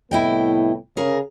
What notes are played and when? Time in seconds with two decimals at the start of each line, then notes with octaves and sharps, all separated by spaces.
0.11 C2 A2 B3 E4 D#5 G5
0.97 C#3 G#4 A#4